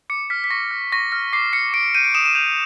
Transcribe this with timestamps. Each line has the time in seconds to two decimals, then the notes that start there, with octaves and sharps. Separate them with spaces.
0.10 D6 C#7
0.30 F6 B6
0.44 B6
0.50 C#6 A#6
0.71 F6
0.92 C#6 A#6
1.12 F6 A#6
1.33 D6 C7
1.53 F6 C#7
1.74 D6 D7
1.95 G6 D#7
2.04 D7
2.15 D#6 E7
2.25 E7
2.35 G6 F7